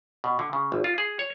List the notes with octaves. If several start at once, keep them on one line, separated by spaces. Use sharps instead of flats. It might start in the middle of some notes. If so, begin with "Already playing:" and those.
B2
D3
C#3
G#1
F4
G#4
C#5